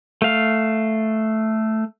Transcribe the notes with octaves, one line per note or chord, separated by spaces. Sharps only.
A3 F5